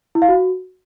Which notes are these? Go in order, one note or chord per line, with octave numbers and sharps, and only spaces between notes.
E4
F5
F#4